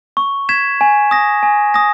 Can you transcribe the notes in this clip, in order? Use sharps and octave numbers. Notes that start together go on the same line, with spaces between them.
C#6
G#6 B6 E7
G#5
D#6 A#6
G#5
D#6 A#6